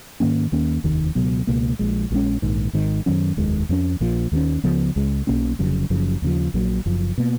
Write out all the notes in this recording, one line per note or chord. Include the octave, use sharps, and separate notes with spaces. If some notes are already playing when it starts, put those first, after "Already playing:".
G#2 D#3 A#3 C#4
D#2 D#3 A#3 C#4
F1 D#2 D#3
C#2 B2 F#3 B3
C#2 B2 A#3
A#1 A#2 G#3
A#1 A#2 G#3 C#4
A#1 G#2 D#3
G#1 G#2 D#3
F#2 D#3 F#3 C#4
F1 D#2 D#3 G#3
F2 F3 G#3 C#4
A#1 A#2 F3
D#2 D#3 G#3 C#4
C#2 C#3 F3 B3
C#2 C#3 G#3
B1 B2 A#3 C#4
F1 F2 C#3 F#3
F#1 F#2 C#3 F3
D#2 C#3 F3
A#1 A#2 F#3
F#1 F#2 F3
B2 A#3